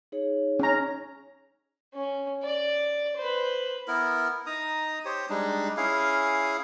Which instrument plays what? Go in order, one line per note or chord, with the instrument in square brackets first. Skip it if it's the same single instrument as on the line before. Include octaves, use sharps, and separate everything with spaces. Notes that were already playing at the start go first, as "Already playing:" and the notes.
[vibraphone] D#4 G#4 C#5
[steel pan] C#4 A#5
[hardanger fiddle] C#4
D5
B4 C5
[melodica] B3 E4 A#4
D#4 A#5 D#6
G4 C5 C#5
G3 G#3 D4 D#4
C#4 E4 G#4 F5